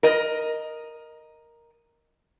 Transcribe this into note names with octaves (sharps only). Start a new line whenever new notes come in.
A#4 D#5